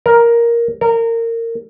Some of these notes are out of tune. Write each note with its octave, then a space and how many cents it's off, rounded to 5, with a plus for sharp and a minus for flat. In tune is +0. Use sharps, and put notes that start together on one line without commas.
A#4 +5
A#4 -25